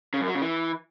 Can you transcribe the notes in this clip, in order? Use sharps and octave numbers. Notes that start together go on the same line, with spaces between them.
C#3
F#2
F#3
C#3
E3